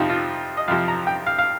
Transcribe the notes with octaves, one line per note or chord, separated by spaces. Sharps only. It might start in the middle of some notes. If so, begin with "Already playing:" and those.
Already playing: F2 C3 F3 D#4
F4
D#5
F2 C3 F3 F5
A#5
G5
F5
F5